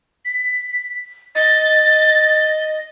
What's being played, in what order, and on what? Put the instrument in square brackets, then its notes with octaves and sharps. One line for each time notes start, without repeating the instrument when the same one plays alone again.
[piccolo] B6
[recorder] D#5 [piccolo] A6